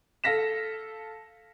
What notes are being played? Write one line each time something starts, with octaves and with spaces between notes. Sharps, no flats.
A4 F5 A#6 B6 E7